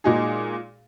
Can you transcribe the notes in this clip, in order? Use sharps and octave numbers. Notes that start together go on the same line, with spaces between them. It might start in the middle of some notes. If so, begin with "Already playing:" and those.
A#2 G#3 D#4 F#4 G#4